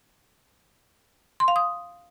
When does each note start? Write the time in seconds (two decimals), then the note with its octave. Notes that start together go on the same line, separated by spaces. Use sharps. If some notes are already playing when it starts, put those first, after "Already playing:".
1.40 C6
1.48 F5
1.56 D#6